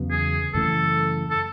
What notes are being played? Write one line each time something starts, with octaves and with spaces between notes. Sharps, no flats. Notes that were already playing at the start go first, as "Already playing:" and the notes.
Already playing: E2 C#3 F#3 B3
G#4
F#2 C#3 E3 A3 A4
A4